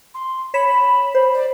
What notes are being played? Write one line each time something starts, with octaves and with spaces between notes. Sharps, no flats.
C6
C#5 B5 B6 E7
C5
D5